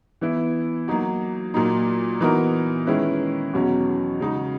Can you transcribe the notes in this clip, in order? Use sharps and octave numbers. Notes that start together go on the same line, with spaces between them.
E3 B3 E4
F#3 A#3 D#4 F#4
A#2 F#3 A#3 D#4
E3 B3 D#4 F#4 A#4
D#3 G#3 C#4 E4 B4
E2 B2 F#3 C#4 F#4
C#3 G#3 D#4 F#4